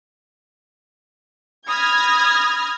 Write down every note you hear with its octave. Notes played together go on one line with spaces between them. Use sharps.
B5 D#6 F6 G#6 A#6